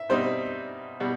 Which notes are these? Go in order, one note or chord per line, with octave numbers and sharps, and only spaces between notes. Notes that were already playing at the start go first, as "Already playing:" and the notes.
Already playing: E5
B2 G3 C4 D#4 C5
B2 G3